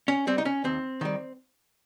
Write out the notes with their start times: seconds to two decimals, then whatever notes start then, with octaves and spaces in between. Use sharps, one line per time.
0.08 C#4
0.27 G3 C4
0.38 D#4
0.45 C#4
0.64 D#2 C4
1.01 D#3 G3